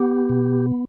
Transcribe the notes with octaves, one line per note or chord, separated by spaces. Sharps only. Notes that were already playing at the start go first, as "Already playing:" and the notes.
Already playing: B3 G4
B2